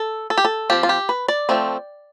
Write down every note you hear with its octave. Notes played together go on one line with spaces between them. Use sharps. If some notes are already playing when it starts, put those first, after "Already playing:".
Already playing: A4
A4
G4
A4
F3 C4 G4
F4
G4
B4
D5
F3 A3 C4